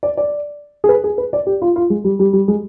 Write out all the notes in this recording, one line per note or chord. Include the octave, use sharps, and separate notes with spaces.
D5
D5
G#4
B4
G#4
B4
D5
G4
F4
F4
G#3
G3
G3
G3
G#3